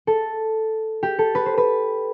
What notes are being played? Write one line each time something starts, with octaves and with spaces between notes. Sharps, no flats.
A4
G4
A4
B4
C5
B4